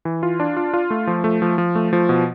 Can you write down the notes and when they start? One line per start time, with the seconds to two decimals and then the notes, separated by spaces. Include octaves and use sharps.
0.05 E3
0.23 F4
0.40 D4
0.57 F4
0.74 F4
0.90 A3
1.07 F3
1.24 A3
1.42 F3
1.58 F3
1.75 A3
1.93 F3
2.09 B2